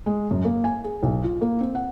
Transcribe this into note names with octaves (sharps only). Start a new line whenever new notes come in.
G#3
F#2
A#3
G#5
G#4
B1
F4
A#3
C4
F#5